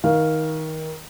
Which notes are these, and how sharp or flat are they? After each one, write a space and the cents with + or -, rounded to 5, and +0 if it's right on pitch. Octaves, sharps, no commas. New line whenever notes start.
D#3 +20 F5 +0